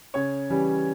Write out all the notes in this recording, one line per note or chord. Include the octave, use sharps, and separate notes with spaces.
C#3 C#5
E3 G3 C#4